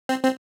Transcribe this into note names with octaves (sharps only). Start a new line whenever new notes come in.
C4
C4